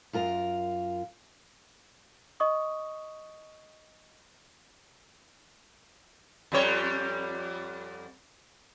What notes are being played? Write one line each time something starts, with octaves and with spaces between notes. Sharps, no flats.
F#2 F4 A#4
D#5 C#6 D#6
F2 G3 C#5